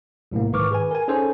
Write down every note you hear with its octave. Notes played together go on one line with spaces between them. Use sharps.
B1 A2 C3 A#3
G#2 D#3 B4 C#6 D6 F6
G#4 B4 G#5
A#4 G#5
C#4 D#4 G#4 A4 C5 G#5